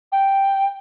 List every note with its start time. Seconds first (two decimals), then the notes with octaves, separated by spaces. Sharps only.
0.12 G5